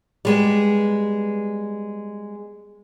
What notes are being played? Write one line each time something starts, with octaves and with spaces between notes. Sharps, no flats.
G3 G#3 B3